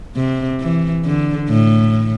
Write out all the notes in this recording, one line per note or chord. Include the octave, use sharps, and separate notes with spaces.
C3
E3
D3
A2